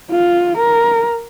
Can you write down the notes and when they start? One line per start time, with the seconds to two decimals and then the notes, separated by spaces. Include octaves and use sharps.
0.11 F4
0.57 A#4